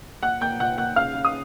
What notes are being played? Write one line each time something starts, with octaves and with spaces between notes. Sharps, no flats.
A#2 F#5 F#6
A#3 G5 G6
A#2 F#5 F#6
A#3 F#5 F#6
C#3 F5 F6
C#3
D#6